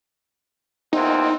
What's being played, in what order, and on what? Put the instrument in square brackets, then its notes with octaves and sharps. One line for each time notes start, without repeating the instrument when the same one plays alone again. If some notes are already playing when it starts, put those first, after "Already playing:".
[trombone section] E2 A#2 C4 [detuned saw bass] D#4